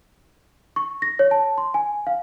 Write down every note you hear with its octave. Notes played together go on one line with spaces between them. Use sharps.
C#6
A#6
C#5
A5
C6
G#5
F5